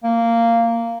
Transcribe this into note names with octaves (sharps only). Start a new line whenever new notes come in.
A#3